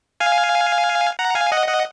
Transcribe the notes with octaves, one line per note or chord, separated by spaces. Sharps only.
F5 G#5
F#5 A#5
F5 G#5
D#5 F#5
D#5 F#5